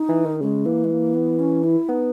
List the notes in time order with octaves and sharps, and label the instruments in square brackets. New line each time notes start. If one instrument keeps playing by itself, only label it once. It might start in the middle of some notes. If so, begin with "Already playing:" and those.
Already playing: [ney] D#4
[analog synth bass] E3
D#3
[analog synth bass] C#3 [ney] G#3
[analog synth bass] E3 [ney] A#3
[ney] G#3
A#3
B3
C#4
E4
[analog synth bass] B3 [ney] D#4